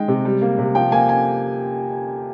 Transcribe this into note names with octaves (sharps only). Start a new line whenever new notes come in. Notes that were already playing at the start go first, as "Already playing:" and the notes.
Already playing: D#3 G#3 G5
C3
G3
A#3
C3
F3 G5
A#3 G#5
G#5